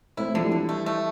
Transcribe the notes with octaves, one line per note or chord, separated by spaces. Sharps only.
A3 C4 E4
D3 F3 A3
E3 G3
D3
A3
A3